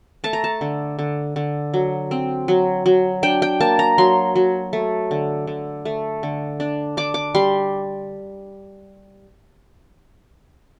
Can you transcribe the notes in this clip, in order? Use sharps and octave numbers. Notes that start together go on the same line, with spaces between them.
A3 A5
A#5
A5
D3
D3
D3
F#3
C4
F#3
F#3
D4 G5
G5
A#3 A5
A#5
F#3 C6
F#3
A3
D3
D3
A3
D3
D4
D4 D6
D6
G3 C6